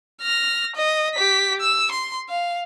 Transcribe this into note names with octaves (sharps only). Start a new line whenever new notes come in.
F6 A#6
D#5
G4 B6
E6
C6
F5